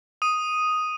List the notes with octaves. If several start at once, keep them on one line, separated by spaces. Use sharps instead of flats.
D#6 D#7